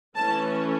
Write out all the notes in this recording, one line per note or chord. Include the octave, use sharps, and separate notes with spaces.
E3 A3 C#4 A5